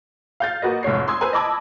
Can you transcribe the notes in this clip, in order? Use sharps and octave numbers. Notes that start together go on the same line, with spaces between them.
F5 G6 A6
A#3 F#4 B4 D#5
F1 G#2 C#5 C7
C6 D#6 E6 G#6
B4 C5 G#5 A#5
D#5 A5 B5 D6 E6 G#6